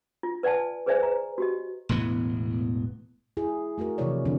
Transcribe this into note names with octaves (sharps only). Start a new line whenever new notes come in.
F4
B4 D5 F#5 G#5 A5
G#4 B4 C5 D5 E5 G#5
B4 A#5
F#4 G4 D#5
E1 A2 E3 B3
E4 G#4
A3 F#4 G#4 A#4
C3 E3 F3 E4 C#5 D5
D3 F3 C4 D4 F#4